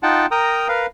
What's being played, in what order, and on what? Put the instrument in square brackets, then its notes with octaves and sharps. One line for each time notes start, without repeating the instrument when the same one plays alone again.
[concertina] D#4 F4 F#5 G5 A5
A#4 G5 A#5 D#6
A#4 B4 F5